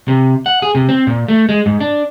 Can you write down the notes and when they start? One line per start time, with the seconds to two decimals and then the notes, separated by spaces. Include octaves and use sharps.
0.08 C3
0.46 F#5
0.62 G#4
0.75 C3
0.89 C4
1.07 A#2
1.28 A3
1.49 G#3
1.66 G#2
1.80 D4